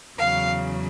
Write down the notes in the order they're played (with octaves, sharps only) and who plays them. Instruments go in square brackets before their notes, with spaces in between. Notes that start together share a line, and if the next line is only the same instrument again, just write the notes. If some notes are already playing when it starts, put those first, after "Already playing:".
[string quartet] E2 C#3 F#3 F5